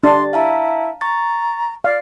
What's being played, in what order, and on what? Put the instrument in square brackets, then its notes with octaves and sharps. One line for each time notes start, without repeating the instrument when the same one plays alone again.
[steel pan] D4 [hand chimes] G4 A6 [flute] C6
[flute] E4 [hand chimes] F5 A5 A#5
[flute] A#5 [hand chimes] C#6 A6
[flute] D5 [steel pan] F5